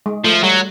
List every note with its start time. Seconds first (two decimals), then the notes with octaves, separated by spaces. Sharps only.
0.06 G#3
0.24 F3 A3
0.43 F#3 G3